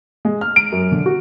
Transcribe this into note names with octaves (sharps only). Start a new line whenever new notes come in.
G#3
F6
D7
F#2
D3
F#4